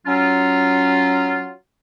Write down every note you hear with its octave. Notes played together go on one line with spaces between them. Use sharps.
F#3 C#4 F4